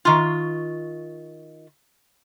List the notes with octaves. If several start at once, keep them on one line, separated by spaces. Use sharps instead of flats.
D#3 F4